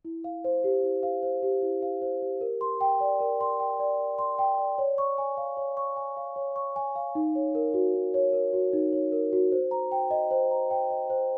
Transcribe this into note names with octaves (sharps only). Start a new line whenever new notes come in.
E4
F5
C5
G4
E4
F5
C5
G4
E4
F5
C5
G4
A#4
C6
G5
D5
A#4
C6
G5
D5
A#4
C6
G5
D5
C#5
C#6
G#5
F5
C#5
C#6
G#5
F5
C#5
C#6
G#5
F5
D#4
C#5
A#4
F#4
D#4
C#5
A#4
F#4
D#4
C#5
A#4
F#4
C5
A#5
G5
D#5
C5
A#5
G5
D#5
C5